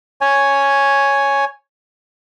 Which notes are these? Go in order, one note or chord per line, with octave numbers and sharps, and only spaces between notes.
C#5 G#5